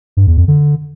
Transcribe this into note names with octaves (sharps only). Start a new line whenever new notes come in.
G2
E2
F2
D3